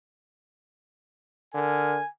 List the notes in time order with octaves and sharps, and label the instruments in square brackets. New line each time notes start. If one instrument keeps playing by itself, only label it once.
[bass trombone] D3 [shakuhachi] A#4 [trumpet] G#5